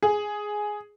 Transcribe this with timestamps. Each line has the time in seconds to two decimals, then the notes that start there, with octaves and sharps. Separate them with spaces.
0.03 G#4